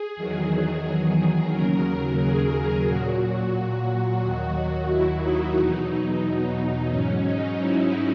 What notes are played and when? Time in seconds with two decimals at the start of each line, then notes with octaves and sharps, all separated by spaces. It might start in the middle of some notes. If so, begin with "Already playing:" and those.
Already playing: G#4
0.16 E2 D#3 F#3
0.84 G#4
1.51 D#2 C#3 F#3 A#4
2.19 G#4
2.86 A#2 F#3 F#4
4.20 D#2 D#3 F#3 F#4
4.88 E4
5.22 D#4
5.56 E2 B2 F#3
6.90 G#2 F#3 C#4
7.25 D#4
7.59 E4